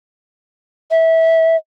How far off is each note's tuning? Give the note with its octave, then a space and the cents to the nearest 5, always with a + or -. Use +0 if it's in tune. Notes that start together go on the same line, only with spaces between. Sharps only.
E5 -20